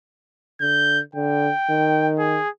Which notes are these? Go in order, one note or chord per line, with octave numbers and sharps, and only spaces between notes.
D3 G6
D3 G5
D#3
G#4